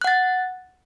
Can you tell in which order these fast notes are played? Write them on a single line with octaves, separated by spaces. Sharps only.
F#6 F#5 A6